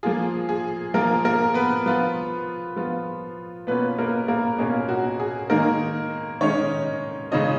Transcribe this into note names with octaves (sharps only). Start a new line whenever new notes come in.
F3 A#3 F4 G#4
G#4
F3 A#3 F4 A#4
A#3 A#4
B3 B4
F3 B3 F4
F3 B3 F4
B2 A#3 B3 C#4 F4 B4
A#3 A#4
A#3 A#4
B2 A#3 C#4 F4 G#4
F#4
G#4
D#3 G#3 A#3 D#4 A#4
D#3 G#3 C#4 D#4 C#5
C#3 G#3 C#4 D#4 F4 D#5